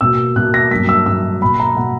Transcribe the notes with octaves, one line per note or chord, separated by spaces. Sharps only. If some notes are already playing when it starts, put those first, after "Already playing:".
B2 A#3 E6
B2 A#3 F#6
A#6
G2 F#3 A#3 B6
E6
G2 F#3 A#3 E6
B2 A#3 B5
A#5
B2 A#3 F#5